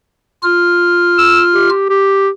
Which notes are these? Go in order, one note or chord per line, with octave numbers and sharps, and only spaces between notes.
F4 F6
E6
G4
G4